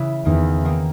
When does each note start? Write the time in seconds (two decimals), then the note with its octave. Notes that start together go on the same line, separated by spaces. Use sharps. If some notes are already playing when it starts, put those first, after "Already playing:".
Already playing: C#3 E3 E4
0.25 E2 D#3 A#3 D#4
0.65 D#3 A#3 D#4